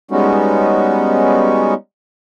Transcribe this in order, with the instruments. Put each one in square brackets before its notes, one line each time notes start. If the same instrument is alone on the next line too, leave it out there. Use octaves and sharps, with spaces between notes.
[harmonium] G3 G#3 B3 C#4 D#4 F#4